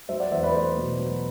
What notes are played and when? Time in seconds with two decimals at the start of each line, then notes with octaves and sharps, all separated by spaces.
0.09 F#3 C5 E5
0.20 D5 F#5
0.32 E2 C5 E5
0.43 B4 D5
0.54 A3 C5
0.77 B2
0.99 F#3